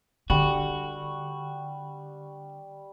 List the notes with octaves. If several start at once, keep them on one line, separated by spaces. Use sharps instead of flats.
D3 G3 F#4 C#6